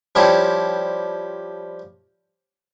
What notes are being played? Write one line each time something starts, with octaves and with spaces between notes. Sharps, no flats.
F3 G3 C#4 E4